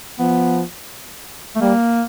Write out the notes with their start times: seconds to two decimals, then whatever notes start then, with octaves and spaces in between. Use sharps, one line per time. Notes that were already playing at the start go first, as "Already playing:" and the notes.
0.19 F3 B3
1.56 A3
1.61 G3 A#3